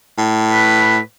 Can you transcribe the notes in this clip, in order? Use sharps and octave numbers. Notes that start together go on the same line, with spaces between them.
A2
B4